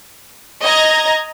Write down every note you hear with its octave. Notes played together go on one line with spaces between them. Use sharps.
D#5 A#5 G#6 A#6